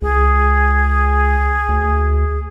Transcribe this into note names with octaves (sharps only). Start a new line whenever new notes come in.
C#2 G#4
D2